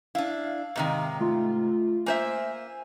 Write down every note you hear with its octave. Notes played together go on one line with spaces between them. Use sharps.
D4 E4 F5
G#2 C3 D#3
A3 F4
A#3 C5 E5 G#5